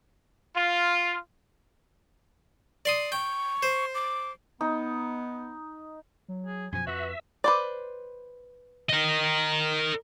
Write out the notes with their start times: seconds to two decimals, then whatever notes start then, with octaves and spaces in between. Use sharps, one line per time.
0.56 F4
2.85 D5 C6 D#6
3.12 G5 C#6
3.63 C5
3.95 D6
4.61 B3 D#4
6.28 F#3
6.46 G#4
6.72 F#2 B2 F3 G#5
6.87 F2 F#4 B4 E5
7.44 B4 C5 D5
8.90 A#4 D#5